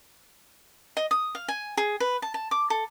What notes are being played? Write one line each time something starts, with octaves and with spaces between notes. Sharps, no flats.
D#5
D#6
F5
G#5
G#4
B4
A5
A5
D6
A4